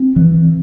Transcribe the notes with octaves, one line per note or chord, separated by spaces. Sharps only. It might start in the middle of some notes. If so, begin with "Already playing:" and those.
Already playing: C4
E3